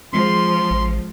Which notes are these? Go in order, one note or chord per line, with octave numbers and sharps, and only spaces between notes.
F3 G#3 C4 C6
A1